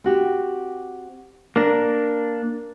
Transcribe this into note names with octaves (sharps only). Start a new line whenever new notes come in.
C4 F#4 G4
A#3 D4 A#4